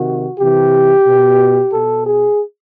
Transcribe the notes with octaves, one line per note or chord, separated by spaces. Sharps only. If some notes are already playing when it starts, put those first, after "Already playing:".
Already playing: C3 D#3 F#4
C3 E3 G4
B2
B2 A4
G#4